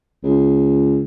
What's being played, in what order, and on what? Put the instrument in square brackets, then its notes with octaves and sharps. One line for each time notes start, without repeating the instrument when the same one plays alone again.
[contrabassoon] C#2